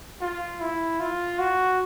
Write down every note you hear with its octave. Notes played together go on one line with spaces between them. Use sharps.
F4
E4
F4
F#4